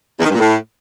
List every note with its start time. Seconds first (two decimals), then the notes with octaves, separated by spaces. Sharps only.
0.19 E2
0.24 D#3
0.29 G2
0.34 A#2
0.40 A2